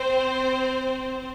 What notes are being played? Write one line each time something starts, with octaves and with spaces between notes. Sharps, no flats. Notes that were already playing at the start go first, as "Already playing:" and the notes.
Already playing: C4 C5